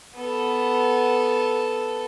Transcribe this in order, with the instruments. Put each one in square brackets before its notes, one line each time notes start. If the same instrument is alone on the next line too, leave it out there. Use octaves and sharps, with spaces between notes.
[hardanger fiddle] B3 A4